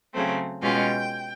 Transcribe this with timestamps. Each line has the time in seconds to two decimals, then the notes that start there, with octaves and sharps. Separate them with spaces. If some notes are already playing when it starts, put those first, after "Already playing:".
0.13 C#3 F#3 A3 C4
0.61 B2 G#3 C#4 F4 G5